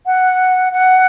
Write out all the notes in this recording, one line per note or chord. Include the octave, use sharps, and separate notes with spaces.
F#5
F#5